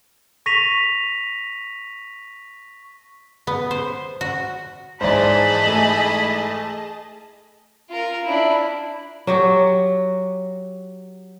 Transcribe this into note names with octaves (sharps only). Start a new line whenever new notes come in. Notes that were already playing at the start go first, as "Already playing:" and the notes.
C#6 A#6 B6 D#7 F7
B3
C5
F#4
G#2 E3 G#4 C5 D5 D#5 A5 B5
A3
F4 A#4
D4 E4
F#3 F#4 G4